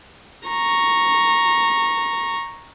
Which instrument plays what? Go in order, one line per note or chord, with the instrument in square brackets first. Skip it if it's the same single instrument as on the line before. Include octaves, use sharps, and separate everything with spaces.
[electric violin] A#5 C#6